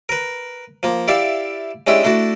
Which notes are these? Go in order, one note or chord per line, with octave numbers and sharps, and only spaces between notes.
A#4 B4
F3 A#3
E4 G4 D5 E5 F5 A5
G#3 C#4 D4 E4 G4 E5
A3 D4 E4 F#4 A5